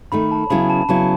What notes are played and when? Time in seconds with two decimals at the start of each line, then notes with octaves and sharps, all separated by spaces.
0.12 D#3 A3 D#4 B5
0.32 A5
0.50 C#3 F#3 B3 E4 B5
0.70 A5
0.89 C#3 F#3 B3 E4 A5